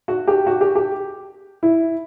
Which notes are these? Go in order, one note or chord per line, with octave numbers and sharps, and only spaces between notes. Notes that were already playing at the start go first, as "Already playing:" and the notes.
F#4
G4
F#4
G4
G4
E4